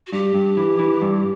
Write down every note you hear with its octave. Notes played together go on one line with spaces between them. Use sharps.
F#4
G2 G4
G2
E3
E3
G2